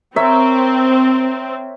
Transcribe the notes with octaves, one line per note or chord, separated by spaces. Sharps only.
C4 A#4 C#5 E5